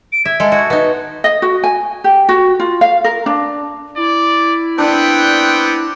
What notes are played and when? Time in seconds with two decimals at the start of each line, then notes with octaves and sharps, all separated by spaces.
0.12 D7
0.25 E5 G#6
0.40 G#3 A4
0.52 F#4
0.70 B3 D#4
1.24 D#5
1.42 F#4
1.64 G#5
2.04 G4
2.29 F#4
2.60 F4
2.81 F5
3.04 A#4
3.26 D4
3.97 E4 D5
4.78 B3 C4 D4 G5